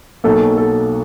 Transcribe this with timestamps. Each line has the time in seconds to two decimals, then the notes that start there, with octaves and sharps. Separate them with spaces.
0.24 B1 B2 F#3 A#3 A4
0.58 A4